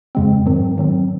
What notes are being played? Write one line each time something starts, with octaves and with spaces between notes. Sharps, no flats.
F2 C#3 G#3 C4
G#2 D#3 F#3 C4
G#2 D#3 F#3 C4